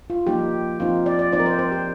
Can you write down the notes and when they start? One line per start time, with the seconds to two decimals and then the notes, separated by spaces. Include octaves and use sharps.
0.10 F4
0.27 F3 A#3 D#4 G4
0.80 F3 C4 D#4 F4
1.06 D5
1.19 D5
1.32 F3 C4 D#4 D5
1.39 A#4
1.46 C5
1.59 C5
1.72 G4